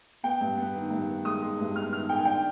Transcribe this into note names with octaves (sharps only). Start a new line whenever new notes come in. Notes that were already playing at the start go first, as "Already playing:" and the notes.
B3 G5
G2
B3
D#3
G2
D#3
G#3 D#6
G#3
G2
B3 F6
D#3 F6
D#3 G5
G#5
D4 G5